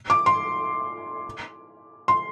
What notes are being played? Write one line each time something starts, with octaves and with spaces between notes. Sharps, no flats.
D6
C6
C6